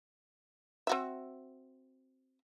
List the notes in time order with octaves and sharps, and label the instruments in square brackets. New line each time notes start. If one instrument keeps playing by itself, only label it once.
[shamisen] C4 F#4 E5